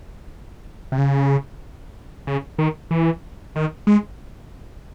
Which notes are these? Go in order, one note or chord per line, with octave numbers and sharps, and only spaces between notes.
C3
C#3
C#3
D#3
E3
D#3
G#3